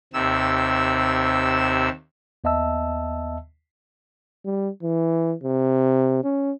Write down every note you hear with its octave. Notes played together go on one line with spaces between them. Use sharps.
D#2 C3 E6
D#2 B3 D#5 E5 A5 E6
G3
E3
C3
C#4